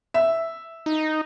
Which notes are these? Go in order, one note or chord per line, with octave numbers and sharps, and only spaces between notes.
E5
D#4